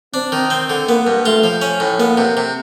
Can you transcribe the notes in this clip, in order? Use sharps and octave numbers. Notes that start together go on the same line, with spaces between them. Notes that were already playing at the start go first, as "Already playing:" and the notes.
C4 D4
D#3
C4
D3
A#3 B3
G2
A3 F4
F3
C#4
A2
A#3 B3
C3
C3